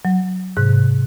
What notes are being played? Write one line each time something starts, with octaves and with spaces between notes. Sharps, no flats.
F#3
G#2 C3 F#6